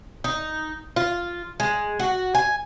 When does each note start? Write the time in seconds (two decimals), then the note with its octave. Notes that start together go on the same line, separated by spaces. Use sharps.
0.24 D#4
0.96 F4
1.60 G#3
1.99 F#4
2.35 G#5